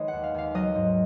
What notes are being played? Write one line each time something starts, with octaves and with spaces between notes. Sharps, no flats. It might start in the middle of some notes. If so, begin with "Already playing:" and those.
Already playing: D#3 G#3 B4 C#5 D#5
D#2 F#5
F5
D#2 F5
F#3 D#5
G#2